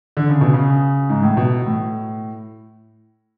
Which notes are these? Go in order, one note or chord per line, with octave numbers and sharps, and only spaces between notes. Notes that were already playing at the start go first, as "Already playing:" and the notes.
D3
C#3
B2
C#3
G#2
A2
B2
A2